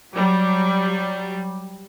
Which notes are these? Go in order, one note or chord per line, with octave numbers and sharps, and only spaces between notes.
F#3 G3